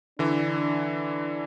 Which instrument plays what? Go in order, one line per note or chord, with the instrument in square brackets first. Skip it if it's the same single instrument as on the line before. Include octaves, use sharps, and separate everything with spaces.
[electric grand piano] D3 E3 [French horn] D4